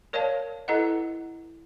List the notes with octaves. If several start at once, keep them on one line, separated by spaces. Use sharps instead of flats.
A#4 C#5 D5 F5 A5
E4 A4 B4 D#5 F#5